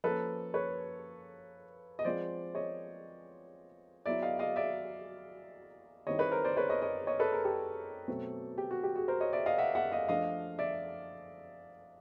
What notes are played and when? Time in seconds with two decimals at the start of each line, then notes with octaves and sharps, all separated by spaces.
0.04 F3 A#3 C#4 A4 B4
0.54 B4 C#5
1.99 D#5
2.05 F3 G#3 C4 F4 C5 D5
2.55 C#5 D#5
4.06 F#3 B3 E4 D5 E5
4.23 D#5 F5
4.39 D#5 F5
4.56 D5 E5
6.07 D#3 G3 C4 E4 C#5 D#5
6.19 B4 C#5
6.32 A#4 C5
6.44 C5 D5
6.57 B4 C#5
6.69 C#5 D#5
6.82 C#5 D#5
7.07 C#5 D#5
7.20 A4 B4
7.32 G#4 A#4
7.45 G4 A4
8.08 B2 F#3 A3 C4
8.58 G4
8.71 F#4
8.83 G4
8.95 F#4 G#4
9.08 A#4 C5
9.21 C#5 D#5
9.33 D5 E5
9.46 D#5 F5
9.58 E5 F#5
9.75 E5 F#5
9.92 D#5 F5
10.09 F3 A3 D4 D#5 F5
10.59 D5 E5